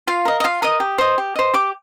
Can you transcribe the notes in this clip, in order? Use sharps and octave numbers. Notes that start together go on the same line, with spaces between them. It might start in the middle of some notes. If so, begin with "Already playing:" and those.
F4 F5
A#4 D#5
D#5
F4 F5
A#4 D#5 D#6
G4
C5 D#5
G4
C5 D#5
G4 D6